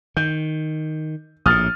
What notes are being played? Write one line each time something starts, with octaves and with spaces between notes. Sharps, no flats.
D#3 G6
A#1 A2 D#6 F6 A6